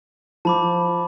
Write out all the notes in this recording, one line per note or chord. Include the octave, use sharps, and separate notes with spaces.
F3 A5 B5 D6